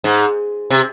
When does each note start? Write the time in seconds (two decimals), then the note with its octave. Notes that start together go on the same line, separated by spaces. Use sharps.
0.04 G#2
0.70 C3